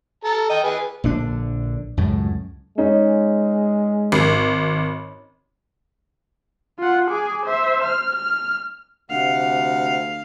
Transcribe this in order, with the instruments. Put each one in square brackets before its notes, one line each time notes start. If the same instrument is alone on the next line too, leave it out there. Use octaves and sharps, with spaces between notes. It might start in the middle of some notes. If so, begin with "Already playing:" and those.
[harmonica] A4 A#5
D#5 G5
G#4 B4
[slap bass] A#1 D3 D4
C#2 F#2 A2
[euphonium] G#3 [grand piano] C#4 D#4
[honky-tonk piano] G#1
[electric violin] F4 F#5
G#4 D6
C5 E5
F6
F6
[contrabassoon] D2 [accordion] C3 F#5 [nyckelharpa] F5